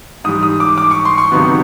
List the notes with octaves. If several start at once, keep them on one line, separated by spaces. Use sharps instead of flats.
G#2 E3 G3 D#6
D#6
D6
D6
C#6
C6
C#6
C#2 C3 D#3 F#3 B3